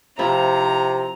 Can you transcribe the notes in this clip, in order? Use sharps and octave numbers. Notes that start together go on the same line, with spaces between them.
C3 F3 E4 A#5